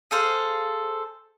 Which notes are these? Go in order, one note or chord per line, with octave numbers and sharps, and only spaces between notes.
G#4 A4 C5 F5